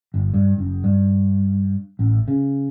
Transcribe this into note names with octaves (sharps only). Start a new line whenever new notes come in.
G1
G2
F#1
G2
A1
C#3